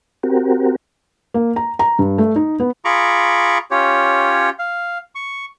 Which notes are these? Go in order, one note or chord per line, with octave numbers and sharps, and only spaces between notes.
C4 F#4 G4 A#4
A#3
A#5
A#5
G2
A3
D#4
B3
F4 G#4 A#5 B5 C#6 D6
C#4 F4 G4 C#5
F5
C#6